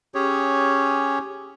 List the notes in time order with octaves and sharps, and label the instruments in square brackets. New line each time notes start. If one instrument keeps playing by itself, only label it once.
[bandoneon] C#4 G4 G#4 C#5